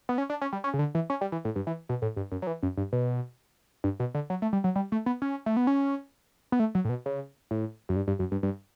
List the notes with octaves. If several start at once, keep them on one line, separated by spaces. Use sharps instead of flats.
B3
C#4
D4
C#4
G3
C#4
C#3
D3
E3
C#4
G3
E3
A2
G2
E3
B2
A2
G2
F#2
F#3
E3
F#2
G2
B2
G2
B2
D3
F#3
A3
G3
F#3
G3
A3
B3
C#4
A3
B3
C#4
B3
A3
F#3
A2
B2
C#3
A2
F#2
G2
G2
F#2
G2
G2